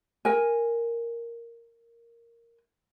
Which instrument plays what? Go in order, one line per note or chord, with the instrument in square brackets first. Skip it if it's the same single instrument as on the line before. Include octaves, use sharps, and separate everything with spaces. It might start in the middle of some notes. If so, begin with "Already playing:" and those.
[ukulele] A#4 G#5